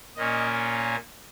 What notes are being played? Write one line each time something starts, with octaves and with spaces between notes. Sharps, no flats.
A#2 A#3 C#4 D#5